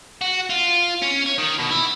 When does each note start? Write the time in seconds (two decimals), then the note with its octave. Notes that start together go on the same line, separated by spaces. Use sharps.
0.21 F#4
0.50 F4
1.02 C#4
1.26 C#5
1.38 D#3
1.59 B2
1.71 E4